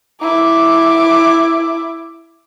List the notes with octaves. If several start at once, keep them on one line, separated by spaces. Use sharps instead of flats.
E4 D6